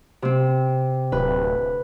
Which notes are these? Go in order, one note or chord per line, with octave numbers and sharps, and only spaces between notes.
C3 C4
D1 B4